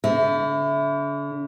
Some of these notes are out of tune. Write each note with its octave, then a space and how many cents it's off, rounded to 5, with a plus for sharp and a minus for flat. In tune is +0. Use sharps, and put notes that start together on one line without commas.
D3 -45 E5 +0